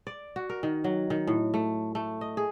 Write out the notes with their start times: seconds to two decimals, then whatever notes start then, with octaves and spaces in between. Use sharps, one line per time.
0.07 D5
0.36 F#4
0.49 A#4
0.63 D#3
0.84 F#3
1.10 D#3
1.27 A2
1.54 A3
1.95 A3
2.21 D#5
2.37 G#4